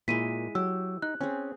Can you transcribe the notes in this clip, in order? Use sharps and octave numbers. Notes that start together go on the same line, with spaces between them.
A#2 G#3 E4 B6 D#7
F#3 G4 E6
D#4 F#6
C4 C#4 G#4